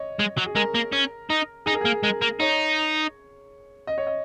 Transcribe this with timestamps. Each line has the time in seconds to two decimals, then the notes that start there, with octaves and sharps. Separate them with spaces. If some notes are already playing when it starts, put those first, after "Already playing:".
Already playing: C#5 D#5
0.19 G#3
0.38 F#3
0.46 G#4
0.55 G#3 A#4
0.75 A#3
0.92 C#4
1.30 D#4
1.66 D#4 G#4
1.74 A#4
1.81 A#3 G#4
2.03 G#3 A#4
2.22 A#3
2.40 D#4 C#5
3.87 D#5
3.98 C#5
4.07 D#5